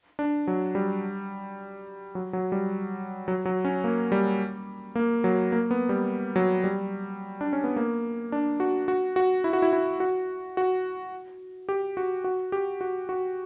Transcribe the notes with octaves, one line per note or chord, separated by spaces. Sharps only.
D4
F#3
G3
F#3
F#3
G3
F#3
F#3
C#4
A#3
G3
A#3
F#3
A#3
B3
G3
F#3
G3
D4
C#4
B3
A#3
D4
F#4
F#4
F#4
E4
F#4
E4
E4
F#4
F#4
G4
F#4
F#4
G4
F#4
F#4